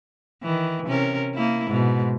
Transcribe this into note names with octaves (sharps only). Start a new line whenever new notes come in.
D#3 E3
C3 C#4 A#4
A#3 E4
G#2 B2